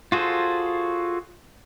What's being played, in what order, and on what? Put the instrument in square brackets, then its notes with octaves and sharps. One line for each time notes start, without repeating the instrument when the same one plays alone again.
[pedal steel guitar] F4 F#4 G#4 A4 C5